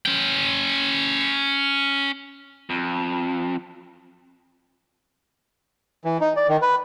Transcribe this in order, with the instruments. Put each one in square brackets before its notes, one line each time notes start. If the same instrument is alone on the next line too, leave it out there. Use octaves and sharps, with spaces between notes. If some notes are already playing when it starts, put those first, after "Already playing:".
[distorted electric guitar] C#4 G5
[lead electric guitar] F2
[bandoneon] E3
D#4
D5
D#3
B4